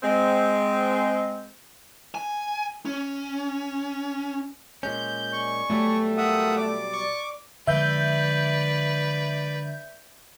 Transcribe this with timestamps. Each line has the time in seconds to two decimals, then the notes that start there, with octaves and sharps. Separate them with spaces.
0.03 G#3 C4
2.15 G#5
2.85 C#4
4.83 A#2 G#3 C#4 G6
5.32 D5 G#5 C#6
5.70 B2 F#3 G3 A3
6.18 F4 A#4 E5 F#5 D#6
6.57 D5 D6
6.93 C#6
7.67 D3 F3 G#3 B4 D5 E5 G6